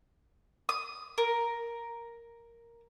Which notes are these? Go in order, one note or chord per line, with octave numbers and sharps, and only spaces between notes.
D#6
A#4